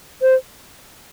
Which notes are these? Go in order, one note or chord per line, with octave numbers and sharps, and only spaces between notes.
C5